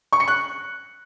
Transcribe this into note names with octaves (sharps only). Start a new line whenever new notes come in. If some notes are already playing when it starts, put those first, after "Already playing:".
C#6
C#7
F#6